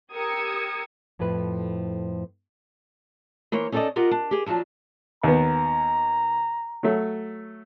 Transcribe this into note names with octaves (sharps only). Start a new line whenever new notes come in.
G4 A#4 D#6 E6 G#6 C#7
F2 A2 F3 E4 B4
E3 A#3 C5 C#5
C#4 D#4 A4 C5 D5 D#5
F4 G4 A#4 D#5 F#5
D4
G4 G#4
D#2 F3 F#3 D4 A5
D#2 B3 A#5
F#3 A3